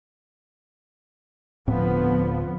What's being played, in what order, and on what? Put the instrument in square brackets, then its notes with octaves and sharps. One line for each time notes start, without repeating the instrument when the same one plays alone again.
[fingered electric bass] D1 A2 C4 [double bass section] D3 F3 B3